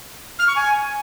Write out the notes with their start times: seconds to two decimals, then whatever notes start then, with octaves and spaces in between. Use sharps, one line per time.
0.39 F6
0.47 C#6
0.56 G#5